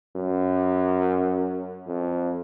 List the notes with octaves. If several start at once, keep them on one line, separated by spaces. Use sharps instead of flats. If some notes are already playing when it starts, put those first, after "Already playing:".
F#2
F2